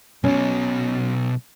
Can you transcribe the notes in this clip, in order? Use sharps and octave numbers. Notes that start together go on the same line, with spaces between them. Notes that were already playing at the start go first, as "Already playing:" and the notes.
B1 B2 C#4